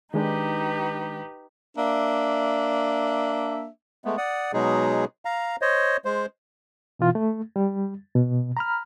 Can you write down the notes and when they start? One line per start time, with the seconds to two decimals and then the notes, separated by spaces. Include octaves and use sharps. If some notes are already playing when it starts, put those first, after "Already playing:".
0.14 D#3 G#3 D4 D#4 G4 B4
1.76 A#3 D4 E5
4.05 G#3 A3 B3
4.17 D5 F#5 D#6
4.53 B2 F#3 G#3 D#4 G#4
5.25 F5 A#5
5.62 C5 C#5 D#5
6.05 G#3 C5
6.99 B2 E3 F4
7.15 A3
7.56 G3
8.15 B2
8.57 A#5 B5 F6